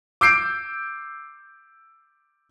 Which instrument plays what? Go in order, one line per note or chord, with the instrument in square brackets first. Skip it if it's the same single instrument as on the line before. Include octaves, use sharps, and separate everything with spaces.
[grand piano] D6 E6 G6 C7 D7